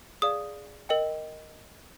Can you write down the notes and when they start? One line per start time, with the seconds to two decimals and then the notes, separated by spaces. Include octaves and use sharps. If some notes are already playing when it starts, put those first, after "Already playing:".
0.22 G#4 D5 F5 D#6
0.89 A#4 D#5 G5